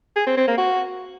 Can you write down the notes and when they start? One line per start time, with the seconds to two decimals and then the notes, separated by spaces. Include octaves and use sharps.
0.16 G#4
0.27 C4
0.37 C4
0.48 A#3
0.58 F#4